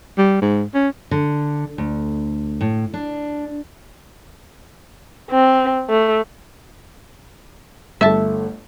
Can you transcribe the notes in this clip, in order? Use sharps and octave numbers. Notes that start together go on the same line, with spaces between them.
G3
G#2
C#4
D3
D2
A2
D4
C4
A3
G1 A3 E5 A5